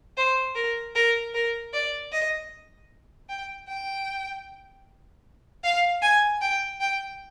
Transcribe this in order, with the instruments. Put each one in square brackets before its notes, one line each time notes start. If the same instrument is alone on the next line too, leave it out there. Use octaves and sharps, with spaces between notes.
[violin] C5
A#4
A#4
A#4
D5
D#5
G5
G5
F5
G#5
G5
G5